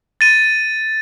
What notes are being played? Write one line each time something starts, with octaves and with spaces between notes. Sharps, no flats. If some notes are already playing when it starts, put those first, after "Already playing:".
A6 D#7